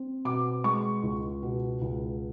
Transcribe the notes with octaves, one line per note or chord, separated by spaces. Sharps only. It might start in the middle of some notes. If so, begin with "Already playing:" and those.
Already playing: C4
B2 D6
G#3 C#6
C#2
B2
C#2